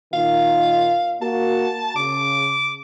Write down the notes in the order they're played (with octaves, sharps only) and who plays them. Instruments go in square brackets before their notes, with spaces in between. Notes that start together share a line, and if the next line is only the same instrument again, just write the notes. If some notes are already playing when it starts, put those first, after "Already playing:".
[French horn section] A#2 D#3 F4 [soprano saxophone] F5
[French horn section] A#3 F#4 [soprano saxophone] A5
[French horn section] C#3 [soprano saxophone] D6